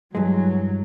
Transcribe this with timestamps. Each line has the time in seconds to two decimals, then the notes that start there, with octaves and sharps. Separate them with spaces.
0.15 G2 E3 F#3 G#3